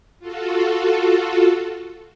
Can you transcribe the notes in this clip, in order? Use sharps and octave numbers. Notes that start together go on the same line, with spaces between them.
F4 F#4 A4